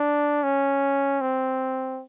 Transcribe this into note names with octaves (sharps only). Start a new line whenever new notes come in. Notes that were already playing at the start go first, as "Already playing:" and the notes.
Already playing: D4
C#4
C4